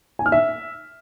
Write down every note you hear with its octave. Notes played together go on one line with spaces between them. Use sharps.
G#5
F6
E5